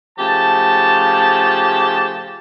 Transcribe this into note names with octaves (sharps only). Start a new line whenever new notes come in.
C#3 F3 A3 G4 A5